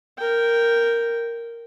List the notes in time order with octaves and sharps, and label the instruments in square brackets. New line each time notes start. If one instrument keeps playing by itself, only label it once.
[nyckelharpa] A#4 G5